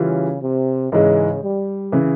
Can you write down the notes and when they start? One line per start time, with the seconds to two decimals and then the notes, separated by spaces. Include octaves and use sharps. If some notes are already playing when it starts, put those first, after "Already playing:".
Already playing: C#3 E3 G3 C#4 F4
0.41 C3
0.91 G#2 C#3 E3 G#3
1.42 G3
1.92 C#3 E3